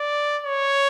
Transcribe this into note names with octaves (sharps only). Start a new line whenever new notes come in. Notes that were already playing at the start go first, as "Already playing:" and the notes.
Already playing: D5
C#5